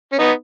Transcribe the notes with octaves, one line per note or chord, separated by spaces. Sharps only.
C#4
B3 D#4